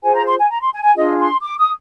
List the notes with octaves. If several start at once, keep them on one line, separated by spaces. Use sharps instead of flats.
F4 G#4 C5 G#5
A#5
C6
G#5
A#5
C6
G#5
G#5
D4 F4 G#4 D#5
C6
D6
D#6